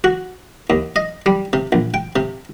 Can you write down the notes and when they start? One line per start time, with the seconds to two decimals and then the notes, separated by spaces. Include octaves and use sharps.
0.04 F#4
0.70 D#2
0.96 D#5
1.26 G3
1.53 C3
1.72 A#1
1.94 G5
2.16 C3